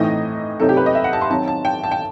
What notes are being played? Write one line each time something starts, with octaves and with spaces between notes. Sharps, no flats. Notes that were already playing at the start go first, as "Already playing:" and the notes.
Already playing: A2 E3 A3 C4 D#4 D#5
C3 F#3 A3 C4 D#4 A4
G4
B4
D#5
E5
F#5
A5
C6
D#3 F#3 C4 A5
A5
G5
A5
G5